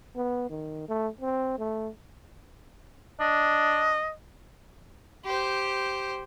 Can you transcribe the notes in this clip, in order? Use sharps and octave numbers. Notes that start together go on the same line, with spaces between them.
B3
D#3
A3
C4
A3
D4 D#5
G4 C5